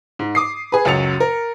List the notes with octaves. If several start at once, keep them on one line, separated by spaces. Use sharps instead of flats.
G#2
D6 D#6 C7
G#4 B4
C#2 F#2 F#3 A6 C#7 F7
A#4